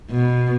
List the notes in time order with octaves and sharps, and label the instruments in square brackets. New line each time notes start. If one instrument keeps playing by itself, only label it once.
[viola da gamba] B2